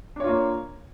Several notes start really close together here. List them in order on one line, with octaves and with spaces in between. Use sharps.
D4 C#5 F4 A#3